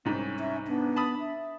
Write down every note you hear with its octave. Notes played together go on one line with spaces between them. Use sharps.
C2 G#2 C#4
E5
B3 D4
A5 B5 D#6
E5